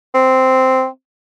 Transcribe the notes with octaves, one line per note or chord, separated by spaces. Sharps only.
C4